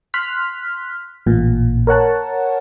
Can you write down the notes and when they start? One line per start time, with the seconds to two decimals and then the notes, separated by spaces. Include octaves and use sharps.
0.14 C6 F6 F#6 B6
1.26 A1 A#2
1.87 A#4 C#5 F#5 A5